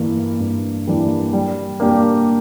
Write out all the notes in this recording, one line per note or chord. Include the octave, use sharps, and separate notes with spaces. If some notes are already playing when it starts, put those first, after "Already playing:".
Already playing: G2 E3 G3 A#3 D4
G2
E3 G3 A#3 D4
G3
A#3 D4 G4